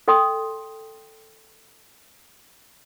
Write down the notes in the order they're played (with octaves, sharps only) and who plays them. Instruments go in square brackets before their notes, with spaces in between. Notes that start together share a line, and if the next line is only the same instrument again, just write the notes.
[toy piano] A4 D5 G5 C6 D#6